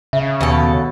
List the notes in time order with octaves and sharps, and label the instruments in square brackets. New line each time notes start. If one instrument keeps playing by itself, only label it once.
[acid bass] C#3 [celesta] E5
[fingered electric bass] D#2 [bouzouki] B2 A4